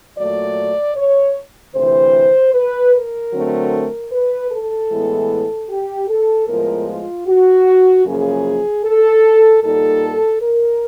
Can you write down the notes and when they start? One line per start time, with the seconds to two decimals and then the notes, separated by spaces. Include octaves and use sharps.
0.17 A#2 F#3 A3 D5
0.96 C#5
1.75 D2 C3 E3 C5
2.54 B4
2.93 A#4
3.33 D3 F#3 A3 C4
4.12 B4
4.51 A4
4.91 A2 E3 G#3 B3
5.69 G4
6.08 A4
6.48 A2 F3 G#3 B3 A#4
6.88 F4
7.27 F#4
8.05 F#2 C#3 F3 A#3 C#4 G#4
8.84 A4
9.63 A#2 G3 A#3 D#4 A4
10.42 A#4